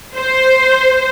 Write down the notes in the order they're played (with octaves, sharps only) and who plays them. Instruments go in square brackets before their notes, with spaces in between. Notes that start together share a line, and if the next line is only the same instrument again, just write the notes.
[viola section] C5